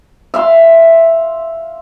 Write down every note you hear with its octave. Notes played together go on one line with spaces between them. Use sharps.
E5 F5 C6